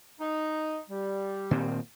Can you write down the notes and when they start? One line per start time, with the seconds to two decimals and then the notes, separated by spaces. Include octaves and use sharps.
0.20 D#4
0.90 G3
1.51 A#2 D#3 C4